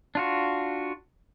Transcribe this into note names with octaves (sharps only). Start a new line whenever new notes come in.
D4 F4 F#4